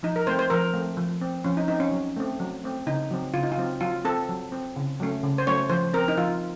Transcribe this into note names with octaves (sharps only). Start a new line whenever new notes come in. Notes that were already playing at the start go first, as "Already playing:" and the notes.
F3 D#4
A#4
A3 C4 C5
C5
F3 A#4
A3 C4
F3
C4
F3 C#4
D#4
C4 D#4
C#4
F#3
A3 C4
F#3
A3 C4
C#3 D#4
F#3 C4
C#3 F4
D#4
F4
F#3 C4
F#3 F4
C4 A4
F#3
C4
C#3
F#3 A3 C#4
C#3
C5
F#3 A3 C#4 C#5
F3 C5
C4 A#4
D#4
F3 F4